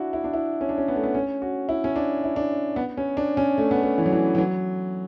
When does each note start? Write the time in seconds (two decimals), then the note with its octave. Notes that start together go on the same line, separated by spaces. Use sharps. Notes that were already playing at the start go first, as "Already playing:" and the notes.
Already playing: D4 E4 F#4
0.13 E4
0.24 D4
0.34 E4
0.61 C#4
0.69 D4
0.78 C#4
0.88 B3
0.96 A3
1.03 B3
1.15 C#4
1.42 F#4
1.69 E4
1.84 C#4
1.96 D4
2.24 E4
2.36 D4
2.76 B3
2.97 C#4
3.17 D4
3.37 C#4
3.58 A3
3.71 B3
3.83 A3
3.98 E3
4.06 F#3
4.13 E3
4.35 E3
4.38 F#3